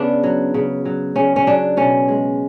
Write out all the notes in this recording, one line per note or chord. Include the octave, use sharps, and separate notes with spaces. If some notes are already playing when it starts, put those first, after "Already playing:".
Already playing: C#3 B3 D4
F#3
C#3
F#3
C#3 C#4
C#4
F#3 D4
B2 C#4
G#3